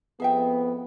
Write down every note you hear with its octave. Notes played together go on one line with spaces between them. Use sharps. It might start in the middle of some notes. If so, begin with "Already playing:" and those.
F2 B3 G#4 E5 G5